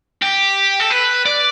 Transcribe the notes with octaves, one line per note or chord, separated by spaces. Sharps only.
G4
A4
B4
D5